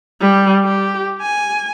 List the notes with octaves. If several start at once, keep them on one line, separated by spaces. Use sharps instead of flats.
G3
G4
G#5